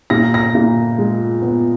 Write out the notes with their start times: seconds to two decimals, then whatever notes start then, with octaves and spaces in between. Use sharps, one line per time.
0.10 A#2 A#6
0.34 A#6
0.55 A#2
0.98 G#3
1.42 B3